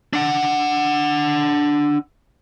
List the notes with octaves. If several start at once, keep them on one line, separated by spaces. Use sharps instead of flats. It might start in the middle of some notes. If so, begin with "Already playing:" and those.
D4 F#5